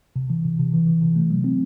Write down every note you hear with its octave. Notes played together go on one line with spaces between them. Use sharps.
C3
E3
C3
C3
E3
E3
C3
A3
F#3
C4